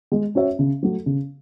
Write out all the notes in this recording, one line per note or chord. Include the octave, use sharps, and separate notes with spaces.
G#3
C#4 F#4 C#5 E5
C#3
F#3 A3
C#3